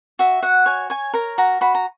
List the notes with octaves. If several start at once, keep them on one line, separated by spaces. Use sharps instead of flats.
F#4 E5
F#4 F#5
C#5 G#5
C#5 G#5
A#4 A#5
F#4 A#5
F#4 B5
A#5